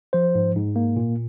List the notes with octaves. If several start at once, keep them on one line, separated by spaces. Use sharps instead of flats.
F3 C5
G#2
G#2
A#3
A#2